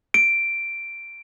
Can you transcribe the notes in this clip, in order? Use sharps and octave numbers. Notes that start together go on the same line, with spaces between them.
D7